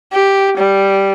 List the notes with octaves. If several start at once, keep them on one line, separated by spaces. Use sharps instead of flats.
G4
G3